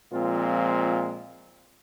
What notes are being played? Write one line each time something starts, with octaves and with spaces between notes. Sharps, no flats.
A#2 F3 G#3 C4 F4